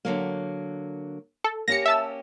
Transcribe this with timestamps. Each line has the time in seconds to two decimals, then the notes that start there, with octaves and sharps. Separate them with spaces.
0.05 D3 F#3 A#3
1.44 A4
1.68 A#3 C#4 G4 A#6 C#7
1.86 E5 A5 E6